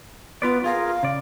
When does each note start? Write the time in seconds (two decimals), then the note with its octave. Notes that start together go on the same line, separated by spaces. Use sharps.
0.42 B3 F4 B4 D5
0.64 F4 G#4 A#4 F5
1.03 C#3 D5